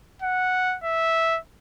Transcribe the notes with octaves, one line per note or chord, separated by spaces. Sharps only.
F#5
E5